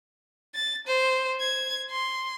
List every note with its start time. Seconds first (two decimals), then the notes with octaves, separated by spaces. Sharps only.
0.55 A6
0.87 C5
1.40 G#6
1.90 C6